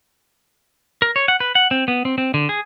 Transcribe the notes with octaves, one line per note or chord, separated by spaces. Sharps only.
A#4
C#5
F#5
B4
F#5
C4
B3
C4
C4
D3
G#4